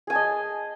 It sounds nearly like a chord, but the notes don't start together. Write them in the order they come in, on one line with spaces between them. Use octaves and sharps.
G#4 G#5 A5 D#5